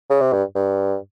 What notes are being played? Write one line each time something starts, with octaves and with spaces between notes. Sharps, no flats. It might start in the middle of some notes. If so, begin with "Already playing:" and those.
C#3
C3
G2
G2